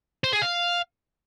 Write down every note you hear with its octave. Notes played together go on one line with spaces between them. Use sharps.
C5
G#4
F5